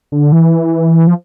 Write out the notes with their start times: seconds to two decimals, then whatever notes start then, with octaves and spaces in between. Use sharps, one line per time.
0.12 D3
0.32 E3
1.07 F3